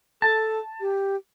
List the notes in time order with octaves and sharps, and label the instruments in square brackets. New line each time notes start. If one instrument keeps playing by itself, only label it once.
[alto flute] A4 [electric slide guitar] A5
[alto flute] G4